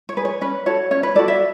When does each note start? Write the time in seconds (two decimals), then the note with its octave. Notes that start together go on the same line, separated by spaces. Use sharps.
0.09 C#5
0.17 G#4 B4
0.25 C#5
0.41 C#4 B4
0.66 F#4 A4 C#5
0.91 C#4 C#5
1.03 B4
1.15 F#4 A4 D5
1.28 E5